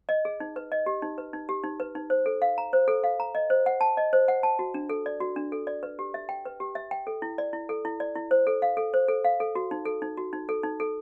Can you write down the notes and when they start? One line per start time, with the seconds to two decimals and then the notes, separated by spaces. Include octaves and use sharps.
0.09 D#5
0.25 G#4
0.40 D#4
0.56 B4
0.72 D#5
0.86 G4
1.02 D#4
1.18 B4
1.33 D#4
1.49 G4
1.64 D#4
1.80 B4
1.95 D#4
2.10 C5
2.26 A4
2.42 F5
2.58 A#5
2.73 C5
2.88 A4
3.04 F5
3.20 A#5
3.35 D#5
3.50 C5
3.66 F#5
3.81 A5
3.97 D#5
4.13 C5
4.28 F#5
4.43 A5
4.59 F#4
4.74 D4
4.89 A4
5.06 D5
5.20 F#4
5.36 D4
5.52 A4
5.67 D5
5.83 B4
5.99 G4
6.14 E5
6.29 G5
6.45 B4
6.60 G4
6.75 E5
6.91 G5
7.07 A4
7.22 E4
7.38 D5
7.53 E4
7.69 A4
7.85 E4
8.00 D5
8.15 E4
8.31 C5
8.47 A4
8.62 F5
8.77 A4
8.94 C5
9.08 A4
9.24 F5
9.40 A4
9.55 F#4
9.71 D#4
9.85 A4
10.02 D#4
10.17 F#4
10.33 D#4
10.49 A4
10.63 D#4
10.80 A4